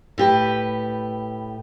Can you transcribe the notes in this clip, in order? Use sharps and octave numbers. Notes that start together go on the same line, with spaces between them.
A2 G4 B4